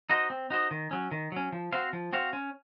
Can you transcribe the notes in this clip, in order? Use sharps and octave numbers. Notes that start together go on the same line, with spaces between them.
D#4 F#4 C5 D#5
C4
D#4 F#4 C5 D#5
D#3
F#3 C#4
D#3
F#3 C#4
F3
C4 F#4 C5 F5
F3
C4 F#4 C5 F5
C#4